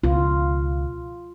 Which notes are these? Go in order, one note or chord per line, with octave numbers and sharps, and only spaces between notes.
C#2 B2 F4